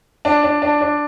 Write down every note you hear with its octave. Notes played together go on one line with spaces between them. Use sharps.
D4
D4
D4
D4